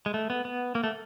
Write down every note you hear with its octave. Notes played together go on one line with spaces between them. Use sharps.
G#3
A3
B3
B3
A#3
A3